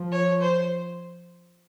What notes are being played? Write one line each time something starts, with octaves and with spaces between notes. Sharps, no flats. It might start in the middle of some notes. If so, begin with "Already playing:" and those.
Already playing: F3
C#5
C5